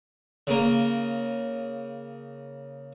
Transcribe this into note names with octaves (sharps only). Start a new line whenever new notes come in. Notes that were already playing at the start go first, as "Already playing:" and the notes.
C#3 A#3